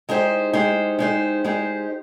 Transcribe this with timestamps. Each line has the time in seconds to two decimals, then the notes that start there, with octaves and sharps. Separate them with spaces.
0.09 G#3 D#4 G4 C5
0.53 G#3 D#4 G4 C5
0.99 G#3 D#4 G4 C5
1.44 G#3 D#4 G4 C5